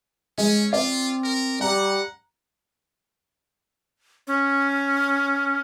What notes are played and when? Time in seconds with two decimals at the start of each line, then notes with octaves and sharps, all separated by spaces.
0.38 G#3 C#4
0.73 C4 F4 D5
1.24 A#4
1.61 G3 F#5 A#5
4.27 C#4